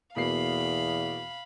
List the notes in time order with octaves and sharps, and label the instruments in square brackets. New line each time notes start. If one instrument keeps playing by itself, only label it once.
[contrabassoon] E2 [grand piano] B2 A#3 C7 [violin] F5 B5